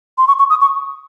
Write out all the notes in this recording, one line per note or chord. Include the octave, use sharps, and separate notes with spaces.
C6
C#6
C#6
D#6
C#6